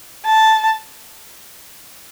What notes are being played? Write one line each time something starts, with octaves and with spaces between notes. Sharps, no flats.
A5